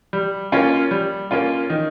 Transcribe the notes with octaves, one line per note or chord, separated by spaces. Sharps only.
G3
A#3 C#4 F4
G3
A#3 C#4 F4
D#3